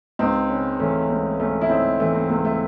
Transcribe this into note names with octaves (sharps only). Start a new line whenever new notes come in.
C#2 C4 D#4
C#3
E3 A3 C#4
C#2 C4
C#2 A3 C#4
E4
C#3 C4 D#4
E3 A3
C4
C#2 A3
A3